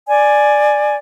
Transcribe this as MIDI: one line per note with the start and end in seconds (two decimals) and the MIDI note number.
0.08 0.96 74
0.08 0.96 80